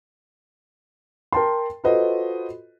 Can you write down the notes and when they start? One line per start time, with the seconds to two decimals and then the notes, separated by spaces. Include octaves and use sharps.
1.32 A#4 G5 A5 C6
1.84 F4 F#4 A4 B4 C5 D#5